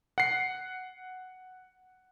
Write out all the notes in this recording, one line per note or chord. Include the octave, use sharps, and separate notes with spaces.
F#5 C7